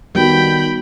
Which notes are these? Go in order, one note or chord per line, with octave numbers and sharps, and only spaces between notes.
D#3 G3 B3 F#4 G5 B5